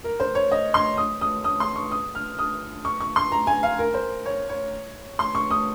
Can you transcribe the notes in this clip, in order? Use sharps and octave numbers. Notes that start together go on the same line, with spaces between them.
A#4
C5
C#5
D#5
C6
D#6
D#6
D#6
C6
C#6
D#6
F6
D#6
C#6
C#6
C6
A#5
G#5
F5
A#4
C5
C#5
C#5
C6
C#6
D#6